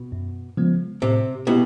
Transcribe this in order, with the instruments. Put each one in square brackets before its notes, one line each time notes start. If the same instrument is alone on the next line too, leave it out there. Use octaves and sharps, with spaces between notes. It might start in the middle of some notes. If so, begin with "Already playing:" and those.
Already playing: [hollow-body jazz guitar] B2
[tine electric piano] F#2
C#3 F3 G#3 B3
[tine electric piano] A2 [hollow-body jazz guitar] C3
[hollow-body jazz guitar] B2 [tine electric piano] B3 E4 G4